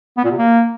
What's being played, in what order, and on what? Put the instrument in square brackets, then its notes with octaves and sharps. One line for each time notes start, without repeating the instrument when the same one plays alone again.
[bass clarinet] B3
A#2
C3
A#3